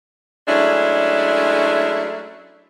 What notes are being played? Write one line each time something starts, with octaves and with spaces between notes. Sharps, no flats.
F#3 G#3 A3 C#4 D4 E4